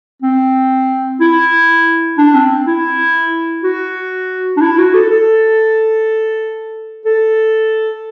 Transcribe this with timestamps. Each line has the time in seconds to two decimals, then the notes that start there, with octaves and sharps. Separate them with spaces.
0.22 C4
1.21 E4
2.18 D4
2.34 C4
2.50 C4
2.67 E4
3.64 F#4
4.57 D4
4.61 E4
4.78 F#4
4.94 A4
5.10 A4
7.05 A4